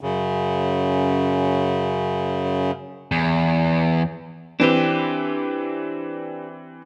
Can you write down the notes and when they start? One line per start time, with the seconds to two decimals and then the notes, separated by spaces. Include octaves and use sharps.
0.01 F#2 C#3
3.12 E2
4.60 E3 C4 D4 G4 B4